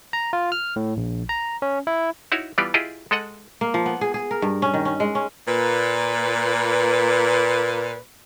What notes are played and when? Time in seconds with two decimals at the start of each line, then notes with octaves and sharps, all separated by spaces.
0.13 A#5
0.33 F4
0.52 F6
0.76 A2
0.97 A#1
1.29 A#5
1.62 C#4
1.87 E4
2.32 D#4 E4 F#4 C#5
2.58 E3 G3 B3 F4 G4 D5
2.74 E4 F4 G4 G#4 D#5
3.11 G#3 A4 D#5 F#5
3.61 A#3
3.74 F3
3.86 B3
4.01 G#4
4.14 G#4
4.31 A#4
4.42 G2
4.62 C#4
4.74 D#3
4.85 C#4
5.00 G#3
5.15 C#4
5.47 A#2 B4